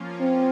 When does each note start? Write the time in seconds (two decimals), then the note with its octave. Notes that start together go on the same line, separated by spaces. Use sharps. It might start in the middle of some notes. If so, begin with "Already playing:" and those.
Already playing: F3 A#3 C#4 F4
0.20 C4